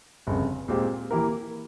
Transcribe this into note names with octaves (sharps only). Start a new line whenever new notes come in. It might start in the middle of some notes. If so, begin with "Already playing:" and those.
G1 F2 C#3
A#2 G#3 C4 G4
E3 A#3 E4 G4 A#4